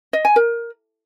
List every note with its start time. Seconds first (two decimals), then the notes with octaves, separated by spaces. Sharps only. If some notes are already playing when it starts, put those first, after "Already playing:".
0.13 D#5
0.25 G#5
0.36 A#4